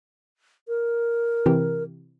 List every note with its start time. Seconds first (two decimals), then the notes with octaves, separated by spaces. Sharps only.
0.68 A#4
1.46 C3 E3 G4